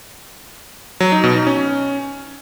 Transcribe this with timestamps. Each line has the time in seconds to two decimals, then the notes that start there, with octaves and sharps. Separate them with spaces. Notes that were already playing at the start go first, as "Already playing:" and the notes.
1.00 F#3
1.12 D#4
1.24 B2
1.35 D#4
1.47 C#4